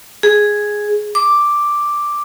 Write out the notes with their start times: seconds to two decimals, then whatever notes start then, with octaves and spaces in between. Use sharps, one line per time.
0.23 G#4
1.15 D6